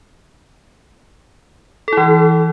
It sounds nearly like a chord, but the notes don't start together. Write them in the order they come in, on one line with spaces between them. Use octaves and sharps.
A4 E4 E3